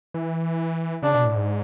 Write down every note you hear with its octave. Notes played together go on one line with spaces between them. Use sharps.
E3
C#3 D4
B2
A2
G#2